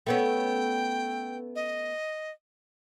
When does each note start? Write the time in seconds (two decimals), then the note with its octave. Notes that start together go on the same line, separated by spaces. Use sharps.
0.07 A3 B3 C#4 G5
1.56 D#5